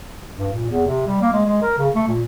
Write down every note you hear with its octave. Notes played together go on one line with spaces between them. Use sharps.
G2
A#2
E2
C3
G3
A#3
G#3
G#3
A#4
C#3
A3
A#2